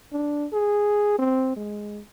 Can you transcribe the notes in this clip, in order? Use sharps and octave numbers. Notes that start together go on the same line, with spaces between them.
D4
G#4
C4
G#3